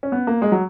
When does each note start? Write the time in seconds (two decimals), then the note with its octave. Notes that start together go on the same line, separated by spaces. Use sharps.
0.03 C#4
0.12 B3
0.27 A#3
0.42 G#3
0.52 F#3